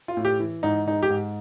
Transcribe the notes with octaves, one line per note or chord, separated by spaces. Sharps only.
F4
A2
G4
E3
G#2 D#4
G#3 D#4
G4
G#2